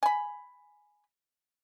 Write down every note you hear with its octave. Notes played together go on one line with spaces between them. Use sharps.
G#5 B5